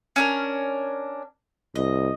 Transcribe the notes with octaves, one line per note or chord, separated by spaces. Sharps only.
C#4 D4 A#4
C2 D#5